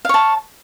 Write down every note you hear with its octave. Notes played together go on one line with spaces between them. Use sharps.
C#5 F5 A5